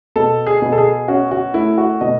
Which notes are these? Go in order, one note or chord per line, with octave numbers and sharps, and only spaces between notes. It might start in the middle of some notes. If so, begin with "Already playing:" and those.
B2 A4
G#4
B2
A4
G#4
C#4 F#4
F#4
A3 E4
F#4
B2 D#5